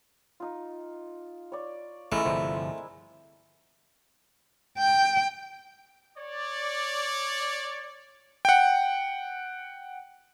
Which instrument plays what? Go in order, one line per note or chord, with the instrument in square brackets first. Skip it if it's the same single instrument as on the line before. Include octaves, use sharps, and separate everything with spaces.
[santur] D#4 F4
C#5 D5
[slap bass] A1 G#2 [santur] G#3 E4 A#4 [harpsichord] A3
[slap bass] G1 C3 F3 [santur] C5 D5
[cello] G5
[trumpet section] C#5 D5
[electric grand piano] F#5 G5